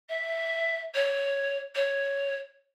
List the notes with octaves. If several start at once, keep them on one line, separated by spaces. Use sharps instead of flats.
E5
C#5
C#5